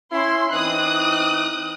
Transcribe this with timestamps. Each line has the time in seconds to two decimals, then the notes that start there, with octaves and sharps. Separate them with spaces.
0.12 C#4 E4 C6
0.51 E3 C4 D#4 D#6 F#6